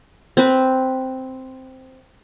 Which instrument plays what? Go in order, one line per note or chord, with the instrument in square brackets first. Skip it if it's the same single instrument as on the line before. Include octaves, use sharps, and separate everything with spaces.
[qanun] C4 B4